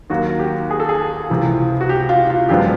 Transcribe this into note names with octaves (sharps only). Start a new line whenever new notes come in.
D#2 D#3 F#3 A#3 F#4
G4
G#4
A4
G#4
C#2 C3 E3
F#4
G4
F4
F4
F#2 D3 F3 G#3 B3 G4